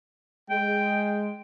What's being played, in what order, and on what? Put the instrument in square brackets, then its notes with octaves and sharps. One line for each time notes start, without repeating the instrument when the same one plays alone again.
[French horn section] G#3 [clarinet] G5